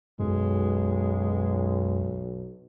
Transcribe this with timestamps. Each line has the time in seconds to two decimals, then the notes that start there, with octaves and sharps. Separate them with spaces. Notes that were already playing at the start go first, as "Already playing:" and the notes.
0.20 B1 F#2 G#3